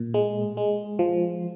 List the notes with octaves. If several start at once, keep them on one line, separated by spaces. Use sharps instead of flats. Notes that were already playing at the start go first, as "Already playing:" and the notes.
Already playing: A#2
G#3
G#3
F3